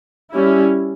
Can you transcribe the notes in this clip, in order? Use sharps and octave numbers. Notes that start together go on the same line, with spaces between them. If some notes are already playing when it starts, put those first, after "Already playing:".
G3 C#4 E4